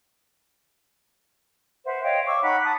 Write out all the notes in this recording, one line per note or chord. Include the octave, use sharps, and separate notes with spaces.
B4 C5 E5 F#5
C#5 D#5 F5 G5
C#6 D6 E6
D#4 F#5 A#5 B5
A5 D#6